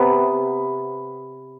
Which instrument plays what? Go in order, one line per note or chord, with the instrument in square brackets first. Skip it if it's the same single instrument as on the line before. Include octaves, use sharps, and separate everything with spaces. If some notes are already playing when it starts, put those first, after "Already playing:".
Already playing: [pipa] C3 B3